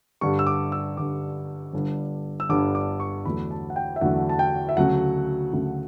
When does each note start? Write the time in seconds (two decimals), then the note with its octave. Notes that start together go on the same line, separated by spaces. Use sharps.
0.21 G2 D3 G3 C#6
0.39 E6
0.47 D6
0.72 E6
0.97 G2 D3 G3 D6
1.73 G1 G2 D3
2.40 E6
2.49 G1 G2 D3 D6
2.75 D6
3.00 C#6
3.25 E2 D3 F#3 A3 B5
3.51 A5
3.70 F#5
3.76 G5
3.96 E5
4.01 E2 D3 F#3 A3 F#5
4.29 A5
4.39 G5
4.69 E5
4.77 D2 C#3 F#3 A3 F#5
5.53 D2 C#3 F#3 A3